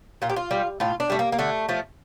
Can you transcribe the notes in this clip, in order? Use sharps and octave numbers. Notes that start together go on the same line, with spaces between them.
A#2 F4
G4
F4
G3
A2 F4
D4
G3 A3
A#3
A#3
D3 A3
F3 A3